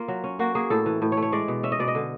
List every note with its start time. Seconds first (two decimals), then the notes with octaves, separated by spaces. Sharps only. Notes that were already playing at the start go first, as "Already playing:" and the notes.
Already playing: A#3 F4
0.08 F#3
0.24 C#4
0.39 A#3 F#4
0.55 A#3 G#4
0.70 A2 A4
0.86 E3
1.02 A2
1.12 C#5
1.17 A3
1.22 C#5
1.32 G#3 D5
1.48 B2
1.63 C#4 E5
1.72 D#5
1.79 B2 D5
1.88 D#5
1.95 D3